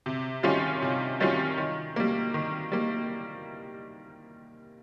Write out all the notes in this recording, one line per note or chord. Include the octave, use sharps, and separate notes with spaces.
C3
D#3 G3 C#4 F4
C3
D#3 G3 C#4 F4
D#3
G3 A#3
D#3
G3 A#3